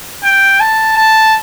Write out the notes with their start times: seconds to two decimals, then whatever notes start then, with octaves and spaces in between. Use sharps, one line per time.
0.24 G5
0.60 A5
0.97 A5